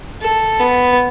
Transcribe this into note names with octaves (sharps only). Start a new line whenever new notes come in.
A4
B3